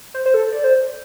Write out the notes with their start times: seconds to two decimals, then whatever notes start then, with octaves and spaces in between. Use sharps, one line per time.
0.14 C5
0.26 C5
0.34 A4
0.52 D5
0.64 C5